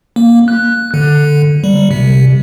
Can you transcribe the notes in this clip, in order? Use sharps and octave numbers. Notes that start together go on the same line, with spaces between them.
A#3
F#6
D3
G3
C3